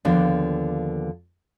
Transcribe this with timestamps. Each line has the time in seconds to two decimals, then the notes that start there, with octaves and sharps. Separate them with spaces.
0.05 D#2 D3 F3 B3 D4